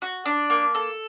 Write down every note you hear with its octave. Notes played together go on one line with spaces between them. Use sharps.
F#4
D4
A#3
A4